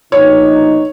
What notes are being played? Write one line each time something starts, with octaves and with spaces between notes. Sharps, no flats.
A#1 B2 D#4 C#5